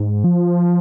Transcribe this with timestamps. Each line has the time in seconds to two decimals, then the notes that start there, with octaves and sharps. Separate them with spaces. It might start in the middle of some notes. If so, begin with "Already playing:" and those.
Already playing: G#2
0.24 F3